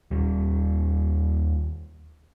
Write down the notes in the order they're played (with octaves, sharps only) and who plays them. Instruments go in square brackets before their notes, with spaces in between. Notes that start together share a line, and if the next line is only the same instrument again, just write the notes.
[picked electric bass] D#2 G3